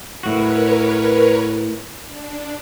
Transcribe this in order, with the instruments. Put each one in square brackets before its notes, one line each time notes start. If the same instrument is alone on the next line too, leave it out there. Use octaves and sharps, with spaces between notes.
[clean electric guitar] A2 F#4 [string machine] A#4 B4 C#5
[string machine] D4